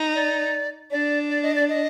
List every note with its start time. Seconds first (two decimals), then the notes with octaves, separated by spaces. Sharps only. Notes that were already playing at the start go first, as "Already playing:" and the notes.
Already playing: D#4
0.14 D5
0.91 D4 D5
1.29 D5
1.42 D#5
1.55 D5
1.68 D#5